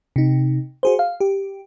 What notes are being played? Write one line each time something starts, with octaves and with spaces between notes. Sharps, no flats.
C3 D#4
F#4 G#4 C5
F5
G4